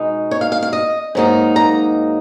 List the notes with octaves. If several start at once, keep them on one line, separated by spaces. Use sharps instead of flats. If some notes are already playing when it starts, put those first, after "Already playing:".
Already playing: B2 G#3 D#4
C#5
F5
F5
F5
D#5
G#2 F#3 A#3 D#4
A#5